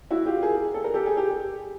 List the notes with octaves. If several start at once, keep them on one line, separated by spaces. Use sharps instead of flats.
E4 F#4
F4 G4
G#4 A#4
A4
A#4
G4 A4
G#4
G4